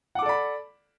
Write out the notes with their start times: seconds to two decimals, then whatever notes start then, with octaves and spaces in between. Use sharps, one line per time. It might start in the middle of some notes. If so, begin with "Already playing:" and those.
0.15 F#5
0.19 D6
0.22 A4
0.26 D5
0.29 B5